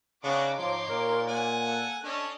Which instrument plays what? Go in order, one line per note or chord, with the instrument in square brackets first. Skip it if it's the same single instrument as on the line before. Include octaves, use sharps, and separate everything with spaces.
[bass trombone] C#3 [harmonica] B3 D4 F#4 [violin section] D#4 C#5 D6
[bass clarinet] G#2 [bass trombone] F3 [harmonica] C6
[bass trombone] A#2 [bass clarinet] A#4
[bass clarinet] A#3 [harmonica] F#5 G#5
[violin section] A4
[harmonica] C#4 [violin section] D4 A4 D#5